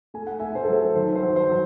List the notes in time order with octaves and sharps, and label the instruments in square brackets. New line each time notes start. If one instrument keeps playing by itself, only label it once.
[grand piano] A3 G#5
F#5
A3 E5 G#5
C5
A4
F#3 C5
D#3 C5
C5
F#3
C5
F#3